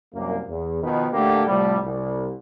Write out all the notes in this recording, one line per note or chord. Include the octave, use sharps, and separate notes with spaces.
C2 F#2 A#3
E2
B2 D#3 F3 B4
A2 D3 A3 A#3 G4
A2 C3 F3 G3
C2